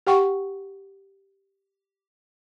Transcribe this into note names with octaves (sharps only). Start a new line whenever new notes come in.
G4 F#5 G5 C#6